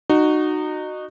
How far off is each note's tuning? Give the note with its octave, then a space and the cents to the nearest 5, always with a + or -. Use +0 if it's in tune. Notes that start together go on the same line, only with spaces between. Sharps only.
D#4 -25 F#4 +0